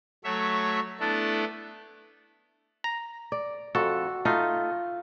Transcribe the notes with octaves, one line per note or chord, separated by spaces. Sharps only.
F#3 A3 C#5 E5
A3 B3 D4 E4 A4
A#5
D5
F2 F#4 A4
A3 D#4 F4